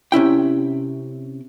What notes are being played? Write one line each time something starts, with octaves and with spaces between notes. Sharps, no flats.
C3 C#4 E4 G5